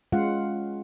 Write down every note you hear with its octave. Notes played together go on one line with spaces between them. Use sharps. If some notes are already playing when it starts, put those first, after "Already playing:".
G#3 C#4 F4 F5 F#5